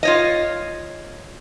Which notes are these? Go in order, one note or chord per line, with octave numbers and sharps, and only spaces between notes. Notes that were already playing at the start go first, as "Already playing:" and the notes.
F4 C#5 D#5